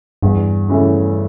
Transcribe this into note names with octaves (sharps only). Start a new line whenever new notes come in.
E2 G2
C#3 E3 A3 C#4